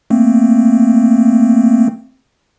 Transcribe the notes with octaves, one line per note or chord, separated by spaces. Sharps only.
A3 A#3 C4